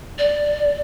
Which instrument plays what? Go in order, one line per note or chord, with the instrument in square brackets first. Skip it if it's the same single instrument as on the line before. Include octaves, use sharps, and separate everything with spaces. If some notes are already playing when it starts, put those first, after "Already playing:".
[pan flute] D5